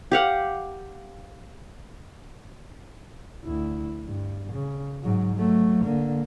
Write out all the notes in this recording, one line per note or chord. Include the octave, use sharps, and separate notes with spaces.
G4 F5 F#5
D2 E4
G2
C#3
G#2 F#3
F#3 A3
D3 A#3